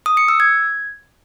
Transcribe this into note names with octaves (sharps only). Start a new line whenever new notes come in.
D#6
C#7
E6
G#6